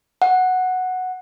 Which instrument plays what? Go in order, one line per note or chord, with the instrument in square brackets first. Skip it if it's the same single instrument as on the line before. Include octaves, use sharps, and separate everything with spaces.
[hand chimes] F#5